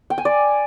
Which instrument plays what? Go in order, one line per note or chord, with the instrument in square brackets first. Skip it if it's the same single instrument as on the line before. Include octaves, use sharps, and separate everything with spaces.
[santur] G5
G#5
D5